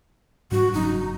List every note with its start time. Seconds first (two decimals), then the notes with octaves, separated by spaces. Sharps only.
0.51 G#2 G3 D4 F#4
0.73 F#1 F#3 C#4 D#4